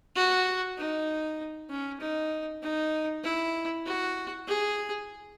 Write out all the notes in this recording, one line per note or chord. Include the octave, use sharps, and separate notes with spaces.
F#4
D#4
C#4
D#4
D#4
E4
F#4
G#4